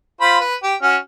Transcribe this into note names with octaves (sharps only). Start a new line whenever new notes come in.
F4 C5 B5
B4
G4
C#4 F#4 F6